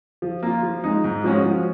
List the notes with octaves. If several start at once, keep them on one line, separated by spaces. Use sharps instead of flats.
F3
A#3 F4
F3
G#3 D#4
G#2
F3 G#3 C#4 F#4
F3